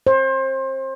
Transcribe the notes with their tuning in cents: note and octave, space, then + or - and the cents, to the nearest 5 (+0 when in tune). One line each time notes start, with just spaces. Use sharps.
C5 +30